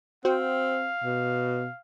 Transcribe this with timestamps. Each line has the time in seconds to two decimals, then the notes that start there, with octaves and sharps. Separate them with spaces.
0.25 C4 F#4 C5 F5 G5
1.04 B2